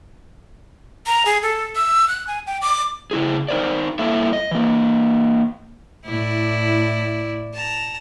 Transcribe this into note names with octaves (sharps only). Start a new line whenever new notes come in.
A#5
G#4
A4
E6
F#6
G#5
G5
D6
C#3 E4 G#4
D#4 A#4 C5 D5
G2 A#3 E4 A4 E5
D#5
E3 A#3
A2 E4 D5
A5 A#5